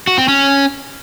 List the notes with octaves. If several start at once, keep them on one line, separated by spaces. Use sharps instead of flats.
F#4
C4
C#4